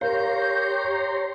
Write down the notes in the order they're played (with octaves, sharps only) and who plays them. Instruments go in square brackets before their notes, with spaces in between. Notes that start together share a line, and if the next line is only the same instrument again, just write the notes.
[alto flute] G4 [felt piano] A#4 F5 [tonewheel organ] C#5 A#5 C6 [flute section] G6